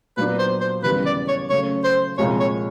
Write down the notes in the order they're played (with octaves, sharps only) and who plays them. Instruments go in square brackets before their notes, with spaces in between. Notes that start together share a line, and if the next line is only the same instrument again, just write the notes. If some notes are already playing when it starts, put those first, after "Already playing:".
[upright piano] A#2 F#3 B3 D4 [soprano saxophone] B4
[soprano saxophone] C5
C5
[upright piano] D#2 C#3 E3 G3 B3 [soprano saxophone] B4
[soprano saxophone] D5
C#5
[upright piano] C#3 F#3 A3 [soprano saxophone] C#5
[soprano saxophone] C5
[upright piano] C2 A#2 F3 G#3 [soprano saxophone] C#5
[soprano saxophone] C#5